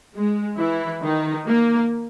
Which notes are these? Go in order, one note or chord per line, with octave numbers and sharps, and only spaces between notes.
G#3
E3 E4
D#3 D#4
A#3